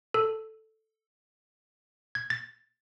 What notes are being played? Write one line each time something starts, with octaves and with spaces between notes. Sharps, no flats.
A4
G#6
A6